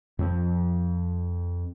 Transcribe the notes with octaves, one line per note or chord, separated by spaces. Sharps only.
F2 F3 A3 C4